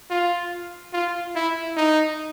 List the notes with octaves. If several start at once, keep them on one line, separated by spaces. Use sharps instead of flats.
F4
F4
E4
D#4